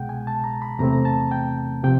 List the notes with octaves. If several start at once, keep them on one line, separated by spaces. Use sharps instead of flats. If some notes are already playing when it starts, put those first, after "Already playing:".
Already playing: C2 B2 G#3 F#5 G5
G#5
A5
A#5
B5
E2 C3 E3 A3 C4 A#5
A#5
A5
G5
C3 F3 G5